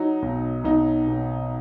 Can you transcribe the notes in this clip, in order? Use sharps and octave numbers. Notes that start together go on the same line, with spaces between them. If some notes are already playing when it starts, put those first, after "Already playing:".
Already playing: F#3 D#4
B1
B1 D#4
B2